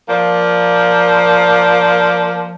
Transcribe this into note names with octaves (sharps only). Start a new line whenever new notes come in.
F3 A#3 D5